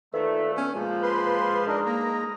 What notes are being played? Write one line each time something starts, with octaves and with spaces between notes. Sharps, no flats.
A#2 D#3 F3 A3 A4 B4 E5
B3 C#4
A#2 F3 G#3
B4 C6
D4 D#4 A#4 D#5
A#3 A#5